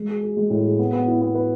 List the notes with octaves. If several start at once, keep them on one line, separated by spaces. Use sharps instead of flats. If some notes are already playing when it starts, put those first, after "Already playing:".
Already playing: G#3
G#4
G#4
G#3
A2
G#4
B3
B3
E4
B3
B4